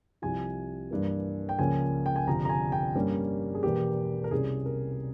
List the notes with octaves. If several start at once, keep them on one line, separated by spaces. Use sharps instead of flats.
C2 C3 F3 G#5
G2 E3 A#3
G5
C#2 C#3 F3 A#3 C#4 G#5
G5
G#5
G1 F2 C3 F3 A#5
A#5
G#5
G5
G2 G3 A#3 C#4
G#4
E1 E2 E3 A#3 G4
A#4
C2 C3 G3 C#4 G#4
A#4